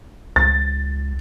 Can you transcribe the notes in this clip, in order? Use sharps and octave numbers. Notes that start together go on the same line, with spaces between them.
C#2 A6